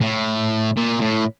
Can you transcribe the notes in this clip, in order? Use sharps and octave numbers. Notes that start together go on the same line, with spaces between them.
A2
A#2
A2